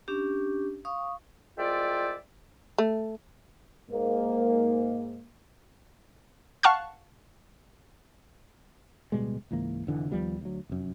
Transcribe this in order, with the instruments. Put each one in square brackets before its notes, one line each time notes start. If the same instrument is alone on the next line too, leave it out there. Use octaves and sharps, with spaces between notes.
[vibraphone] C#4 D4 G4
F5 C#6 D#6
[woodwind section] C2 G#3 F4 D5 E5 G5
[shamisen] A3
[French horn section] G#2 A#3
[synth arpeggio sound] F5 F#5 A5 C#6 F6 F#6
[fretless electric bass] D1 B2 G3 G#3
C#2 G#2 E3 A#3
F1 D3 E3
D#2 F3 G3 B3
D2 F#3
F1 F#2